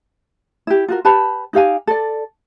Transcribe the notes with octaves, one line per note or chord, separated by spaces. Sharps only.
E4 G4
F4 F#4 A#4
G4 B4 A5 B5
D#4 G4 F5 G#5
A4 D5